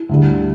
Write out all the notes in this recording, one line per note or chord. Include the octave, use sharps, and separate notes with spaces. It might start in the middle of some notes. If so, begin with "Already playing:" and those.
Already playing: E4
D2 D3 G3